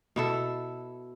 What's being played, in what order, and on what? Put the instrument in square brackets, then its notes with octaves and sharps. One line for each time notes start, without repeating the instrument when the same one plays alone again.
[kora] B2 E4 A4